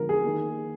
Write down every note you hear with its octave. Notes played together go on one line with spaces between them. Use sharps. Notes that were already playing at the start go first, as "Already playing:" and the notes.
Already playing: D3 F3 G#3 A#4
G#4
D#3 A#3